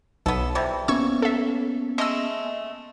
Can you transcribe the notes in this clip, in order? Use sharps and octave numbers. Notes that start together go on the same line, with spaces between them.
B1 B3 A4
C3 E3 G3
A#3 B3 C#4 C#6 E6 G#6
A4 E5
G#3 A3 D#5 E6